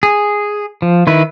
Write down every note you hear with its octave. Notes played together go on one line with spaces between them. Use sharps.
G#4
F3
D#3 E4 B4